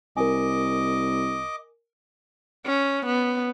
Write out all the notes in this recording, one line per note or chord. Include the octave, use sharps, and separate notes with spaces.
C2 A#4 D#5 G#5 D6
C#4
B3